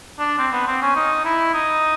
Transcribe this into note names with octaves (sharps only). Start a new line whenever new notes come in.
D4
C4
B3
C4
C#4
D#4
E4
D#4